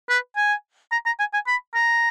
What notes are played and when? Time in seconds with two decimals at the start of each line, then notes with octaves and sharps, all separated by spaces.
0.09 B4
0.37 G#5
0.92 A#5
1.06 A#5
1.19 G#5
1.34 G#5
1.47 B5
1.75 A#5